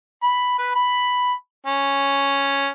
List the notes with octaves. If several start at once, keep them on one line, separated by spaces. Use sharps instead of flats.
B5
B4
B5
C#4